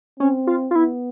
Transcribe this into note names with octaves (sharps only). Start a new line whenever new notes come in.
C4 C#4
F4
F4
B3 E4